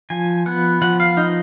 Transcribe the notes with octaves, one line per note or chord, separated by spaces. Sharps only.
F3 G#5
B3 F#5
F3 F#5
F5
D#4